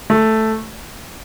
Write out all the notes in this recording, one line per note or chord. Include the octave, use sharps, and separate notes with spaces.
A3